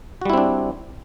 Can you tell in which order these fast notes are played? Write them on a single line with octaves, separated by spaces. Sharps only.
F#4 G3 E4 C4 D4